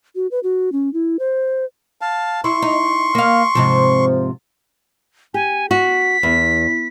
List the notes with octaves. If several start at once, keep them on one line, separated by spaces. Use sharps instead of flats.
F#4
B4
F#4
C#4
E4
C5
F5 A5
E4 C6 C#6
D#4
A#3 F5
G#2 C3 F3
G4 G#5
F#4 B6
E2